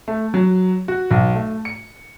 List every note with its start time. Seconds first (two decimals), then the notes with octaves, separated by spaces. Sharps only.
0.08 A3
0.34 F#3
0.88 F#4
1.11 B1
1.35 A3
1.65 C#7